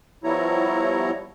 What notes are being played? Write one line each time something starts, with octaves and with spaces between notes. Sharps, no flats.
F3 G3 B3 E4 C#5 A#5